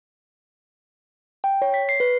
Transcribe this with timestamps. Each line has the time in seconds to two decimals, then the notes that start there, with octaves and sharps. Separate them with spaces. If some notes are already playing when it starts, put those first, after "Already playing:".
1.44 G5
1.62 C#5
1.74 B6
1.89 C7
2.00 B4